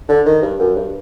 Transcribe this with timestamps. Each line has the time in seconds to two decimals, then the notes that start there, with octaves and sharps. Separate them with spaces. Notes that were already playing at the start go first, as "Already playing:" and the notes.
0.09 D3
0.26 D#3
0.42 G2
0.59 F#2
0.76 G2